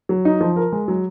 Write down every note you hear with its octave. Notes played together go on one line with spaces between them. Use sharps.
F#3
D#4
F3
A#4
G#3
F#3